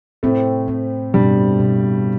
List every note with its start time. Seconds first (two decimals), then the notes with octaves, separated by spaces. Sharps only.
0.23 A2 A3 C4
0.68 C4
1.14 G2 B2 G3
1.60 B2